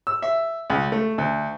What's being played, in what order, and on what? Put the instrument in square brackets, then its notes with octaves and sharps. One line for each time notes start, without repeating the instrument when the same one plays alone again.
[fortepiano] E6
E5
C#2
A3
D2